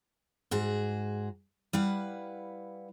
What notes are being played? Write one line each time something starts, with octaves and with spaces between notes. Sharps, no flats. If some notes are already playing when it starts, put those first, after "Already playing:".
G#2 F#4 G#4
G3 E4 B4 F5 F#5